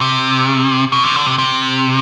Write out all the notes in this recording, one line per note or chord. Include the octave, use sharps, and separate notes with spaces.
C3
B2
C3
D3
C3
C3